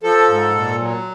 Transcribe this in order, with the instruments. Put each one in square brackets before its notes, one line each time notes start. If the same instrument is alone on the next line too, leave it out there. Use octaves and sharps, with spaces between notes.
[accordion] F3 A4
G#2
A#2
F#3